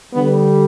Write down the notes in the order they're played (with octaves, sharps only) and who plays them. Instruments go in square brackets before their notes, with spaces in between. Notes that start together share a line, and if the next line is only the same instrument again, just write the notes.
[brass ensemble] D3 G3 B3